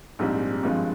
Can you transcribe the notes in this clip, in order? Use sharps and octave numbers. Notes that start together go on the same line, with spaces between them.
A#1 G#2 G3 C4
G#1 G2 F3 G#3 C4